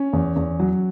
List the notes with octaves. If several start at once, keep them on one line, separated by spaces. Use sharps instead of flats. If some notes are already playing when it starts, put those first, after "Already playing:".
Already playing: C#4
E2
E2
F#3